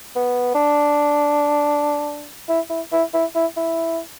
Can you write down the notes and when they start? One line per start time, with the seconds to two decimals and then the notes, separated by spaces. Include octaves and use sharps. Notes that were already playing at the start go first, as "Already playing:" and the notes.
0.16 B3
0.55 D4
2.49 E4
2.70 E4
2.92 E4
3.14 E4
3.35 E4
3.57 E4